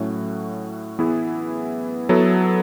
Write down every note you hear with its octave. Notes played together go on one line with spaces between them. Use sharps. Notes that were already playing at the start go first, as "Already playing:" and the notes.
Already playing: A2 F#3 A3 C#4 F#4
E3 B3 E4 G#4
F#3 B3 E4 A4